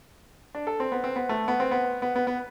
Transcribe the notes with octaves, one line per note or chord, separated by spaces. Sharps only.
D4
A4
C4
B3
C4
B3
A3
B3
C4
B3
B3
B3
B3